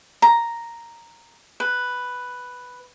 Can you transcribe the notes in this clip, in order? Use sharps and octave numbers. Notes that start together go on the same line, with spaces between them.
A#5
B4